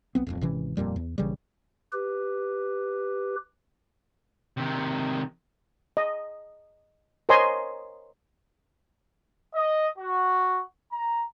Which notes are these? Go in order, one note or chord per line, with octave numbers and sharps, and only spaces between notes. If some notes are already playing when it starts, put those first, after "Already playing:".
B1 B3 C4
D#1 B1 F2
G#1 C3 E3 C#4
D#1 F2 A#2 G3
E2
A#1 C#3 E3 G3
G4 B4
C3 D#3
D#5
A#4 C5 C#5 D#5 G#5 C6
D#5
F#4
A#5